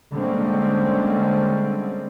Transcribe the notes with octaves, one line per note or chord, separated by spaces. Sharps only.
D3 G3 G#3 A#3 C4 C#4